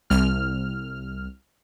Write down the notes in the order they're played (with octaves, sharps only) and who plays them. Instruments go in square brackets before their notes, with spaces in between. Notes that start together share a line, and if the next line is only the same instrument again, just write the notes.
[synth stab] C2 F6